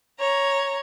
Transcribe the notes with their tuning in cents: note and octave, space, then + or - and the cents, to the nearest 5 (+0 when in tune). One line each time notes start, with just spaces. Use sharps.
C#5 +0 A#5 +10